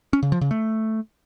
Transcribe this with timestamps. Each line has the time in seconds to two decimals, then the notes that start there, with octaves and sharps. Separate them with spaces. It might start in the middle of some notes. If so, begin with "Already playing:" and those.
0.13 C#4
0.23 C#3
0.32 F3
0.41 C#3
0.51 A3